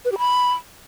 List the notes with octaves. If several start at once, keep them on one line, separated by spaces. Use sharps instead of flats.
B4
G4
B5